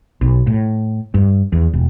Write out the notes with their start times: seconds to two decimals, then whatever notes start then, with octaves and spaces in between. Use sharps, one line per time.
0.21 B1
0.47 A2
1.14 G2
1.52 E2
1.74 E1